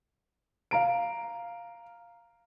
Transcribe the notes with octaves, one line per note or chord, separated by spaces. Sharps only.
F5 A#5 D7